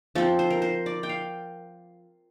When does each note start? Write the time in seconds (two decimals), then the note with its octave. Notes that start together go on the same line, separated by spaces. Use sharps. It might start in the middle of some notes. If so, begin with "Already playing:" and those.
0.15 F3 C4 A4
0.39 C5
0.50 A#4
0.62 C5
0.86 D5
1.03 G5
1.09 F5